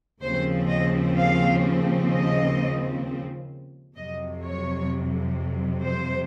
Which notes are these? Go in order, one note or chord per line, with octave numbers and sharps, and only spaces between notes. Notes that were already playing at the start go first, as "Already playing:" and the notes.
D#2 C#3 F3 C4 C5
D#5
F5
D#5
F2 C3 F#3 D#5
C#5
C5